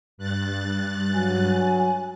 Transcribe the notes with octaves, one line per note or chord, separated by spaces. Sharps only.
G2 F#6 A6
F#3 G#5